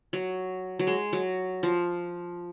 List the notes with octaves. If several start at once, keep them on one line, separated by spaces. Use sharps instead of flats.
F#3
F#3
G#3
F#3
F3